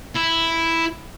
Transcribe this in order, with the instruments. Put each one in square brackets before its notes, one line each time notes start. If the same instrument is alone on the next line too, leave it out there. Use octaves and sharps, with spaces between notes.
[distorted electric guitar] E4